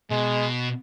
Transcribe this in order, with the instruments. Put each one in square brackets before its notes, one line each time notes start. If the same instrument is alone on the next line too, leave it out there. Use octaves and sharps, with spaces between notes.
[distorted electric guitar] B2 [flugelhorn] G#3